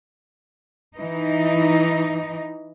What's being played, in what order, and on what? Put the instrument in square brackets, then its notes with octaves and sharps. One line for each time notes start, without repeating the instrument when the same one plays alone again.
[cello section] E3 D#4